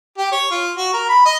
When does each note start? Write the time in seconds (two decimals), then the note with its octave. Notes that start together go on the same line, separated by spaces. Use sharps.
0.18 G4
0.32 C#5
0.51 F4
0.77 F#4
0.93 A#4
1.09 B5
1.25 D#5